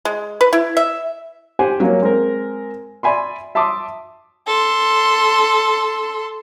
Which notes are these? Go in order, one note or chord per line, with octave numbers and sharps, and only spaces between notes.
G#3
B4
E4
E5
G4 C5 F#5 G#5
F#3 A#3 C#4
G#3 C4 A#4
D5 E5 G#5 B5 C6
E5 A5 C6 D6 D#6
A4 C6